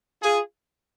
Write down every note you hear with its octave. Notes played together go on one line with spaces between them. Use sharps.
F4 G#4